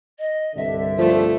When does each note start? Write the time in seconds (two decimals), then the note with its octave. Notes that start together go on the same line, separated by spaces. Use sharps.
0.18 D#5
0.56 C2 G2 D3 E5
0.98 F3 A3 A4